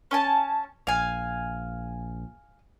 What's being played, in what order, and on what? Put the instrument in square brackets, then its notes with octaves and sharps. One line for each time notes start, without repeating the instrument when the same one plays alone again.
[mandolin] C#4 G#5 A5
[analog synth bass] A#1 [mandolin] F5 G#5